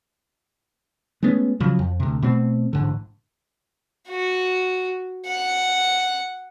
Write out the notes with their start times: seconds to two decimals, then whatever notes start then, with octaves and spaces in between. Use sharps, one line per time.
1.23 G#3 A3 B3 C#4
1.60 C#3 F3 F#3
1.79 F2
2.00 D2 C3
2.22 B2 A3 C4
2.73 A1 G#2 D3
4.09 F#4
5.27 F#5